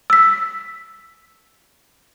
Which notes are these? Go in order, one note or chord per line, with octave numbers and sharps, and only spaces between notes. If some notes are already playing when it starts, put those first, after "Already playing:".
E6 B6